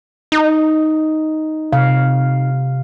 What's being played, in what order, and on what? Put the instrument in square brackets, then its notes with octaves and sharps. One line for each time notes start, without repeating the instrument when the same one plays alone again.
[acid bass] D#4
[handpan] C3 F5